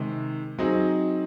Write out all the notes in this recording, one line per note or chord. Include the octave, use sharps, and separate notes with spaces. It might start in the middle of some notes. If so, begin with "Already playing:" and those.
Already playing: C3 D#3 G#3
F#3 C4 D#4 G#4